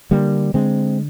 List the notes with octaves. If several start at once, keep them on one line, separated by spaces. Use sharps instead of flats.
D3 G3 A#3
D3 G#3 C4